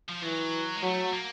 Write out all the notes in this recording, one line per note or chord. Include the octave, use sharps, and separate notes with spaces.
F3
E3 F#3
G#3
F#3 A3
A#3